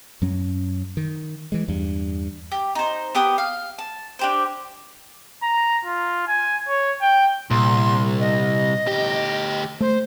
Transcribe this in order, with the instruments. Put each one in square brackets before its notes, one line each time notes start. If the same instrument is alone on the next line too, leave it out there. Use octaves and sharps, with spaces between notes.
[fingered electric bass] F#2 F#3 C#4
D#3
E3 G#3
E2 G2
[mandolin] G4
D#4 C5
B3 G4 G5 D#6
F5
A5
D4 G4 C5
[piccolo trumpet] A#5
F4
G#5
C#5
G5
[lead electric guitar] C2 [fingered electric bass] A#2 [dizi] C6
[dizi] D#5
[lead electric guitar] D2 G4
[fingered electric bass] A3 [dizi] C5